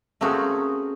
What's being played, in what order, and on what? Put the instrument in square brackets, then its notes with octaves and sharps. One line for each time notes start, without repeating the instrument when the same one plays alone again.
[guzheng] A3 A#3 C4 C#4 F#4 G#4